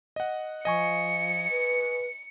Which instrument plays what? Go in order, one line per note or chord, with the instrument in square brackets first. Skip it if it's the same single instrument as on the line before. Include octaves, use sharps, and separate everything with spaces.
[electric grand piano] D#5 F#5
[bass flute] F3 [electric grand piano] D#5 G#5 C#6 [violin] C#7
[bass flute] B4